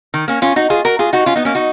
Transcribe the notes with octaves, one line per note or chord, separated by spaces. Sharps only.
D#3
A#3 C#4
C#4 F4
D#4 F#4
F4 G#4
F#4 A#4
F4 G#4
D#4 F#4
C#4 F4
B3 D#4
A#3 C#4
D#4 F#4